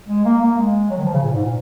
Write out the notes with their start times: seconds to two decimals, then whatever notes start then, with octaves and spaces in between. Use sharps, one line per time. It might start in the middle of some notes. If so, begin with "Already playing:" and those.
0.09 G#3
0.25 A#3
0.41 A#3
0.57 G#3
0.89 F#3
0.98 D#3
1.05 F3
1.14 C#3
1.22 A#2
1.33 G#2
1.43 A#2